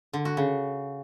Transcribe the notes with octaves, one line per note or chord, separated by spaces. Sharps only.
D3
F#4
C#3